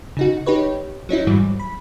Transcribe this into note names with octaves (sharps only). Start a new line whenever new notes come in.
C#3 D#4 F#4
D#4 G4 B4 C#5
F#3 C#4 D#4 E4
G#2 E3 F#3 G3
B5